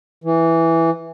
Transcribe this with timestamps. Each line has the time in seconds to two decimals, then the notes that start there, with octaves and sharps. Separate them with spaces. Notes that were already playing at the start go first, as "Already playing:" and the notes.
0.24 E3